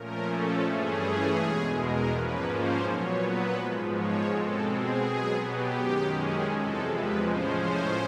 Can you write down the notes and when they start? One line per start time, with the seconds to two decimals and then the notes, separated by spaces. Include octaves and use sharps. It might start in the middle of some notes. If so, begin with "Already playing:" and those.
Already playing: A#2 F3 A3 C#4 A#4
0.29 A4
0.65 G2 E3 A3 C#4 G#4
1.38 E2 B2 G#3
1.75 A#4
2.11 G#2 F3 A#3 C#4 B4
2.48 C5
2.84 A#2 F#3 B3 C#5
3.21 B4
3.57 G#2 F3 G#3
3.94 C#5
4.30 B2 G#3 C4 A4
4.67 G#4
5.03 B2 F#3 B3
5.40 G4
5.76 F#2 D#3 G#3 C#4
6.12 G#4
6.49 E2 C3 F3 G#3 A4
6.86 B4
7.21 A2 F3 G#3 C#4 C5
7.58 C5